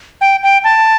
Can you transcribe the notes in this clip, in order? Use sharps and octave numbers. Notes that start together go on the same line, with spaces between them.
G5
G5
A5